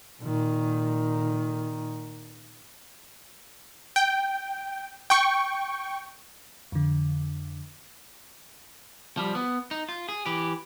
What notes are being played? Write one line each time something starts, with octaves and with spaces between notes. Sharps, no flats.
A#2 D#3
G5
G5 C#6
F2 D3
F3 G3
B3
D#4
F4
G#4
E3 G4